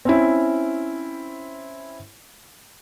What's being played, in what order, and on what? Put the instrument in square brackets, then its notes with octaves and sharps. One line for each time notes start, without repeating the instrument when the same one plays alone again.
[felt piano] C4 C#4 E4